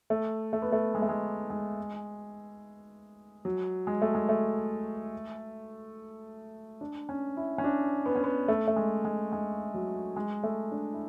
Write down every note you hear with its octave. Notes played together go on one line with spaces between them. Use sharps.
A3
A3
B3
A3
G#3
A3
G#3
G#3
F#3
G#3
A3
G#3
A3
D4
C#4
E4
C#4
D4
B3
C#4
B3
A3
A3
G#3
G#3
G#3
F#3
G#3
A3
D4
E4